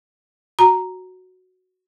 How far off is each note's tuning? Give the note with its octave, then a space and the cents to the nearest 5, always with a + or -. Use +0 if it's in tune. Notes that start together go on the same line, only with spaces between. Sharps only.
F#4 +0 A#5 +0